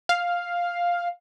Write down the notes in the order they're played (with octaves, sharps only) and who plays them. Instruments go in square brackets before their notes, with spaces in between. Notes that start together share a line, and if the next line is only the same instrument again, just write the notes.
[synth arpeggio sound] F5